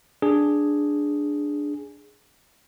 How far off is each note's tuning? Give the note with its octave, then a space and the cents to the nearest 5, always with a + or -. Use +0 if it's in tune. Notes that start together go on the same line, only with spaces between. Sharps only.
D4 +0 G#4 +0